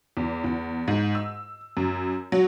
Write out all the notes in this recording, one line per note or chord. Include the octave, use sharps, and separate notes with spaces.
E2
E2
G#2
E6
F#2
F#3